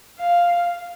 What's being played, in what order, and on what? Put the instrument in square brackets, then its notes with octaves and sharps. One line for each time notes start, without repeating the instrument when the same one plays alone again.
[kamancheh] F5